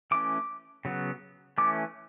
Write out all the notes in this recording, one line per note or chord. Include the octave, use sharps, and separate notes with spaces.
E3 A3 C#4 D6
C#3 F#3 B3
E3 A3 C#4 D6